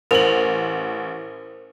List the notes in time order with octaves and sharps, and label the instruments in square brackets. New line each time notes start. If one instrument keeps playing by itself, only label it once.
[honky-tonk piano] A1 F#7 [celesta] A#4 C5 F7